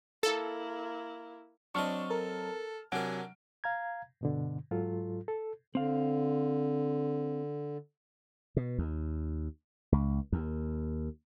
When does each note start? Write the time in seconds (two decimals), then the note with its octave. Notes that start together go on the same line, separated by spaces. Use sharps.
0.23 A#3 E4 A4
1.75 F#3 C4 D4 D#5 A5 C#6 F6
2.11 A4 A#4
2.92 C3 F#3 D4 A#4 F#5 G#5 D7
3.64 F5 A#5 G#6
4.21 G2 B2 D3
4.71 G#2 F#3 F4 A4
5.28 A4
5.75 D3 C4 F5
8.57 B2
8.78 D#2
9.92 C#2
10.32 D#2